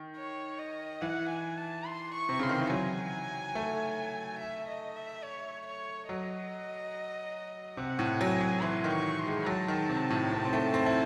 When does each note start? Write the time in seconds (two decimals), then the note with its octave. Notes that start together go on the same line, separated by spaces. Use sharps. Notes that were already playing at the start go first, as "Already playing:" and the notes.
Already playing: D#3
0.16 C#5
0.59 D#5
1.01 E3 F#5
1.29 G#5
1.58 A5
1.86 C6
2.15 C#6
2.29 C3
2.39 C#3 C6
2.49 D#3
2.59 E3
2.70 F#3 G#5
3.55 A3
4.39 E5
4.68 D#5
4.96 E5
5.24 C#5
5.67 C#5
6.09 F#3 D#5
7.77 C3 F#5
7.99 A2
8.20 F#3 G#5
8.41 F#3
8.62 E3 C6
8.84 D#3
8.91 C#6
9.19 C6
9.26 G#3
9.46 F#3 A5
9.68 D#3
9.89 C3
10.10 A2
10.32 C3
10.45 C4
10.53 A3
10.74 C4
10.86 E4